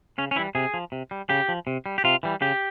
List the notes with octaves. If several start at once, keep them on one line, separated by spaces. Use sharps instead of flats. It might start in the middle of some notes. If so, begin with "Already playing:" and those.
C#3 C#4
C#4
E3 G3 E4
C3 G#4
F3
C3
G3
C#3 G4
F3
C3
G3
G4
C3 F4
E3 G3
C#3 G4